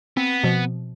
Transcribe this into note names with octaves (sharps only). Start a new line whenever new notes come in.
B3 C4
B2 F3